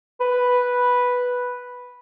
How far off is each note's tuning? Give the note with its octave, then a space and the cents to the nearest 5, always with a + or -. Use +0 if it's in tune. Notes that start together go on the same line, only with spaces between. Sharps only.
B4 -5